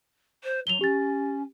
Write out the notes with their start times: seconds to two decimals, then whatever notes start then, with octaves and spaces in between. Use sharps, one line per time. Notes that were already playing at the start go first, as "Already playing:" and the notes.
0.44 C5
0.67 F#3 F7 G7
0.81 C#4 G4 A6